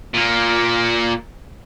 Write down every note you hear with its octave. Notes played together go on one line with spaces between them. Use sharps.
A#2 A#3